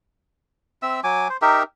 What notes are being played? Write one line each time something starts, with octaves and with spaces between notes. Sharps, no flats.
C4 E5 E6
F#3 G#5 D6
C5
D#4 G4 A#4 E5